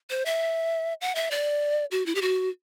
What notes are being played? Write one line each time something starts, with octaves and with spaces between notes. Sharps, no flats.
C5
E5
F#5
E5
D5
F#4
E4
G4
F#4